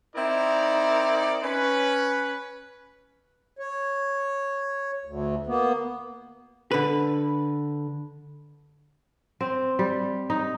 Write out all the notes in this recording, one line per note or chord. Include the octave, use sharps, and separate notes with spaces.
C4 D#4 E4 A#4 D5
C#4 B4
C#5
D2
A#3 B3
D3 B4
C4
G3
D#4